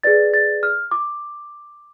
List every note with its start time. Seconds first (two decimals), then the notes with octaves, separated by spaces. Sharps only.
0.03 G#4 B4 D5 A6
0.34 A6
0.63 F6
0.91 D6